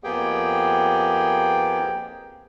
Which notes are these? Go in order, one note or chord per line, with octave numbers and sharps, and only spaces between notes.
F2 A#3 B3 G4 G#4 G5